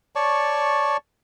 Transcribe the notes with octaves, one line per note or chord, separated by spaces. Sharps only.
C#5 D5 A5 C#6